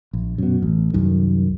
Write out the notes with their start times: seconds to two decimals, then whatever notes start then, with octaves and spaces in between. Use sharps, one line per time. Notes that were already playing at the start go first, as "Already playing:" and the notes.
0.13 A#1
0.38 F#2 B2
0.62 A1
0.94 C2 F#2 D#3